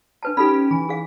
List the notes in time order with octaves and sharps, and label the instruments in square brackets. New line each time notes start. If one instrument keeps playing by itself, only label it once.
[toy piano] D4 B4 A5
[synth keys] C#4 G4 [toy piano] D#4 A4 B5
[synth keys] E3
[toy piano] G#4 F5